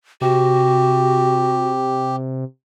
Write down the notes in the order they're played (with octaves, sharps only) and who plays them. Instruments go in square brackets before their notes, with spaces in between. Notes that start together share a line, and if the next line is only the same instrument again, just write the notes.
[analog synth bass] C3 [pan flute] F#4 [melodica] G4